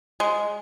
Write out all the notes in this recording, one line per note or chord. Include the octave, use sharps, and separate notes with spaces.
G#3